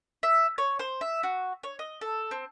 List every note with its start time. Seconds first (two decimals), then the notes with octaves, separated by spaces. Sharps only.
0.23 E5
0.58 C#5
0.79 C5
1.01 E5
1.23 F#4
1.63 C#5
1.79 D#5
2.01 A4
2.31 C4